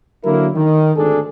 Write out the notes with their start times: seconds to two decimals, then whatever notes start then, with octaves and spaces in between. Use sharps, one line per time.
0.24 D3 F#3 A#3 E4 A#4
0.56 D#3
0.96 G#1 D2 D4 G#4 A4